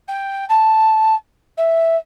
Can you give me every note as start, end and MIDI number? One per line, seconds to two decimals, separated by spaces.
0.08 0.45 79
0.49 1.14 81
1.57 1.96 76